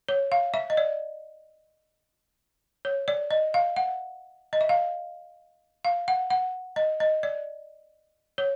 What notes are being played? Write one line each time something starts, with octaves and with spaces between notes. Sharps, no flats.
C#5
F5
E5
D#5
D5
C#5
D5
D#5
F5
F#5
D#5
E5
F5
F5
F#5
F#5
D#5
D#5
D5
C#5